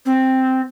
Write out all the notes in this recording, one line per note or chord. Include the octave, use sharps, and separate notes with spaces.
C4